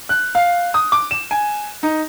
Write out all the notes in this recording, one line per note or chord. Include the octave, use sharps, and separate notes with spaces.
F#6
F5
D#6
D6
E7
G#5
D#4